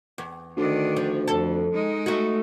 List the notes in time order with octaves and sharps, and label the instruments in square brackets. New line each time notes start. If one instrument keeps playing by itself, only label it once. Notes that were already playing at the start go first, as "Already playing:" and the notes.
[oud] E2
[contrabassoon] D2 [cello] D#3 D4
[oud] F3
[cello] F2 [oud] A4
[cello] G#3 D#4
[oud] A3 F#4